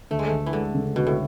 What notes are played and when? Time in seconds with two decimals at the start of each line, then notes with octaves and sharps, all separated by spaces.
0.11 D2 A3
0.19 G#3
0.27 D2 A3
0.46 E3
0.53 D3 G#3
0.74 C#3
0.95 D2 B2
1.07 A2